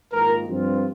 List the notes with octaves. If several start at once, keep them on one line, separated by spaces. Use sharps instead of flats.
G#2 D#3 A#3 F4 A#4
G2 F3 C4 F4